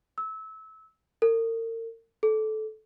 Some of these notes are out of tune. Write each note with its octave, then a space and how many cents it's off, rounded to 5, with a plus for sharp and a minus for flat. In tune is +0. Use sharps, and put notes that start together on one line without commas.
E6 -25
A#4 -40
A4 -20